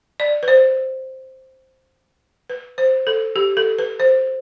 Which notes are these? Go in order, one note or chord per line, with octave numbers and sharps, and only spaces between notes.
D5
B4
C5
B4
C5
A4
G4
A4
B4
C5